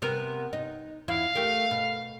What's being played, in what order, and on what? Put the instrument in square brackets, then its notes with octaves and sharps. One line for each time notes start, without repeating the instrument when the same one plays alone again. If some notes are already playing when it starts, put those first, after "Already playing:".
[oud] C3 B3 A#4
D#4
[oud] E2 E4 [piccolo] F5
[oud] A3 G4 A#4
B2